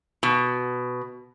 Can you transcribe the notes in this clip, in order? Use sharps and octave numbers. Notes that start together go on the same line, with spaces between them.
B2